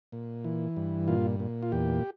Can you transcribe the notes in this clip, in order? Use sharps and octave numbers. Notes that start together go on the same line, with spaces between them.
A#2
E3
G2
A#2 F4
A#2
F4
E2 G4